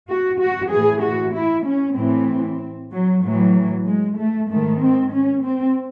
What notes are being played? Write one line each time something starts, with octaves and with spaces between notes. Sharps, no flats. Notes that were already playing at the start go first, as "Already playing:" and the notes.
F#4
F#4
A2 E3 G#4
F#4
E4
C#4
A2 E3 C4
F#3
A2 E3 F#3
G#3
A3
G#2 D#3 A3
C4
C#4
C4